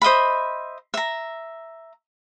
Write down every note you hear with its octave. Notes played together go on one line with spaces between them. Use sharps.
C5 D#5 E5 B5
E5 A#5